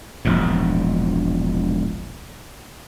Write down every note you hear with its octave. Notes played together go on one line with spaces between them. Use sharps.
E1 A#1 G#2